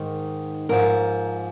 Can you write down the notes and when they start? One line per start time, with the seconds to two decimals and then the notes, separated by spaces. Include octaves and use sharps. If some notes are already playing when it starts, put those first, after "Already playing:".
Already playing: G#2 D#3
0.69 G#2 F3 A#4